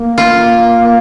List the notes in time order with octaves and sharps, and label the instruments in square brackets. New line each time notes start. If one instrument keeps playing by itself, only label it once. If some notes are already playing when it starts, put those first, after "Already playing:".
Already playing: [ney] A#3
[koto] F4